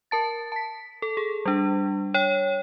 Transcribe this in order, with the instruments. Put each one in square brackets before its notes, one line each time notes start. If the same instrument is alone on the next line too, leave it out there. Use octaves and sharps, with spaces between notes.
[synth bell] A#4 A5 A6
A5 B6
A4
G#4
G3 D4
C#5 G5